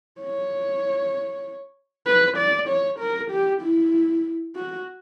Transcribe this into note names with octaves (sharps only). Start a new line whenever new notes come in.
C#5
B4
D5
C#5
A#4
G4
E4
F#4